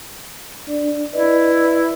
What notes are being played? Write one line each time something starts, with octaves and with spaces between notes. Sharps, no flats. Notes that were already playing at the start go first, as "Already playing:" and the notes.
D4 D5
E4 B4 D5 D#5